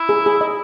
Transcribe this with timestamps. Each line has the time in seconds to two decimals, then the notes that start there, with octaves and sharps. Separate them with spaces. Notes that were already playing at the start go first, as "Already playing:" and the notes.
Already playing: E4
0.09 G#4
0.26 G#4
0.41 D#5